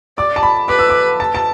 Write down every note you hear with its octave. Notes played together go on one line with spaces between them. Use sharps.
D5 D6
A5
B5
B4 D6
E6
D6
A5
A5